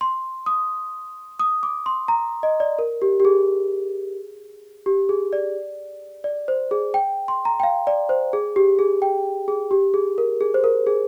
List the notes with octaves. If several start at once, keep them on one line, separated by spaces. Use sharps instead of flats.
C6
D#6
D#6
D6
C6
A#5
D#5
D5
A#4
G4
G4
G#4
G4
G#4
D5
D5
C5
G#4
G5
C6
A#5
G5
F5
D5
C5
G#4
G4
G#4
G5
G#4
G4
G#4
A#4
G#4
C5
A#4
G#4